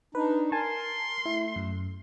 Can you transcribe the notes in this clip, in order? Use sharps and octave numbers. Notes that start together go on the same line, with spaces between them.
D4 D#4 B4
A#4 G#5 A5 C6
A3 E4
F#2